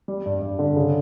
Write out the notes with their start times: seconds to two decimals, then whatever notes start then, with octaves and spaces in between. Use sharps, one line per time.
0.08 G3
0.26 G2
0.42 G2
0.59 D3
0.76 C#3